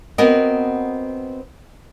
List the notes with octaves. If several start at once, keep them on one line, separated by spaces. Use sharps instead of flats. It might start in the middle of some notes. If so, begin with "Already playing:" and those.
B3 C4 F#4 A#4 D#5